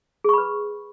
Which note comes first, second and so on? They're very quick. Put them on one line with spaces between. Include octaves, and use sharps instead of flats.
G#4 C#6 B5 B4